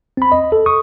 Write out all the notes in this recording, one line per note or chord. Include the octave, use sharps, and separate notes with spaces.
C4 B5
D#5
A4
C#6 D#6